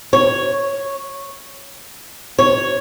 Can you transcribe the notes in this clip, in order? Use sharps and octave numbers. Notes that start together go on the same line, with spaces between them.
C#5
C#5